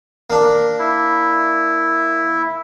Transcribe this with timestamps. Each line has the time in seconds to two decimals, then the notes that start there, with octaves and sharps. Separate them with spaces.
0.30 A#3 D4
0.79 E4